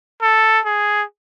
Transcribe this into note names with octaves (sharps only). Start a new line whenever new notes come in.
A4
G#4